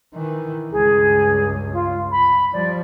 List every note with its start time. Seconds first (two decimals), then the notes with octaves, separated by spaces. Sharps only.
0.15 D#3 E3
0.72 C#2 G2 G#4
1.73 F4
2.11 B5
2.53 F3 G3 D5